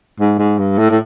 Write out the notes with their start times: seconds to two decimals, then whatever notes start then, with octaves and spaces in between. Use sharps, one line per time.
0.20 G#2
0.39 G#2
0.59 G2
0.79 A2
0.90 A2